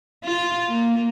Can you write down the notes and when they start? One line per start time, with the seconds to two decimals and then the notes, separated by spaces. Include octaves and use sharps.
0.24 F4
0.68 A#3